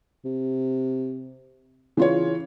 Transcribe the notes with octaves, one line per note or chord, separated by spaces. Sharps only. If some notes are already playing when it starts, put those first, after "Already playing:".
C3
C#3 E3 F4 C#5